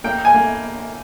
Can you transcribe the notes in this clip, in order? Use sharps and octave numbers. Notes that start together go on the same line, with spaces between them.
A#3 G5
G#5
A#3